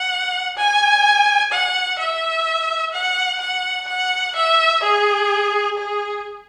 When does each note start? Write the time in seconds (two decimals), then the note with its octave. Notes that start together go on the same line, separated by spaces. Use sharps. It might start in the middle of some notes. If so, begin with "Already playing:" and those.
Already playing: F#5
0.57 G#5
1.52 F#5
1.98 E5
2.93 F#5
3.40 F#5
3.88 F#5
4.35 E5
4.83 G#4
5.77 G#4